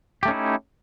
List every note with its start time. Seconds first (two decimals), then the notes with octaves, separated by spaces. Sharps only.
0.23 G4
0.25 A3
0.28 C#4
0.31 D#4
0.33 E4